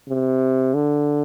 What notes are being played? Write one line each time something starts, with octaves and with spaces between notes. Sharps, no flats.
C3
D3